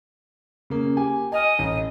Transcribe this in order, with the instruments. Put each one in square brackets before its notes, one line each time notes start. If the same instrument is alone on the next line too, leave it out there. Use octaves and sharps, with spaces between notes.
[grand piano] C#3 A#3
G4 G#5
[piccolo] D#5 [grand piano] G#5 F6
[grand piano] A1